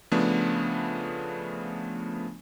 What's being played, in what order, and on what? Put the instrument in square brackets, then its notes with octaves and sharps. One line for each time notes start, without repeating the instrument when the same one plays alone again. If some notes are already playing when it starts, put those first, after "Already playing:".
[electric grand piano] C#3 F3 A3 B3 D4